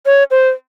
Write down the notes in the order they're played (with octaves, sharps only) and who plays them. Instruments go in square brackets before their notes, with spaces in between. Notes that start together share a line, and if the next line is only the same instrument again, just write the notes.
[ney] C#5
C5